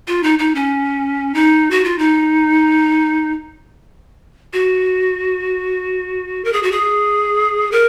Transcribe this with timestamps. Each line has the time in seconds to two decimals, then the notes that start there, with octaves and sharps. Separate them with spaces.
0.08 F4
0.23 D#4
0.39 D#4
0.55 C#4
1.34 D#4
1.71 F#4
1.84 F4
1.98 D#4
4.53 F#4
6.45 A#4
6.53 G#4
6.63 F#4
6.72 G#4
7.72 A#4